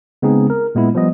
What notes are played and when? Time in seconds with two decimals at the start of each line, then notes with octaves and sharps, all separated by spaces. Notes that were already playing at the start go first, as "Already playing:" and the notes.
0.22 C#3 G#3 B3 C4 D#4 G#4
0.50 A#4
0.75 A#2 G#3 B3 E4
0.95 F3 G3 B3 D#5